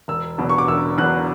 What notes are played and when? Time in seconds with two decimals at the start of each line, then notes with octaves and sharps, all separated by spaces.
0.08 E1 E6
0.38 E2 B2 F#3
0.49 C#6
0.58 D6
0.68 E1 E6
0.98 E2 B2 F#3 F#6